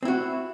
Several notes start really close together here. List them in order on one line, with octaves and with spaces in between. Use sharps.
C4 E4 F#4